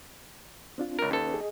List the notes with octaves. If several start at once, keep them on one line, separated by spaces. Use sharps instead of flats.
C4 D4 F4
C#2 A#4
D#2 C#4 A4 B4
G#4 D#5